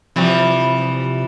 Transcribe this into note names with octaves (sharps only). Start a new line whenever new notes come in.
C3 E3 F3 G3